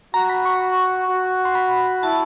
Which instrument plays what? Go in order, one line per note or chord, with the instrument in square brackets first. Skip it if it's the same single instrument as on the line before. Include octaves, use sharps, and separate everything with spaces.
[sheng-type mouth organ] F#4 [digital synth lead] A#5
[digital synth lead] B5
C#6
[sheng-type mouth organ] F#4
[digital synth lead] C6
B5
[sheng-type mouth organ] E4 [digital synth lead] A5